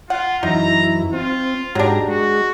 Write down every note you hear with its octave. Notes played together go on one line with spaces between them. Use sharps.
F4 F#5
F#2 E3 D#4 E4 A#5
C4 F4
G#2 F#3 D4 G4 A#5
G#3 F#4